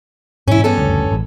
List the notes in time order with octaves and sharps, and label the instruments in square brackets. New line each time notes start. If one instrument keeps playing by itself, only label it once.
[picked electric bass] G#2 B2 E3 [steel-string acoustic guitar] C#4 E4
[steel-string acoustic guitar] G2 C#4 A4 [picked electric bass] B3
[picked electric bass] F#1 D2
A1